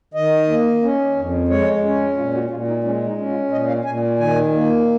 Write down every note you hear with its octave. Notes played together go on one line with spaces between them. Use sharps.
D#3 D#5
A#3
C#4
F2
G#3 C#5
C#4
A#2 F4
F#4
A#2 F4
D#4
G#3 C#4
D#4
C#4
F4
A#2 D#5
F5
A#2 G#5
D#3 G#5
A#3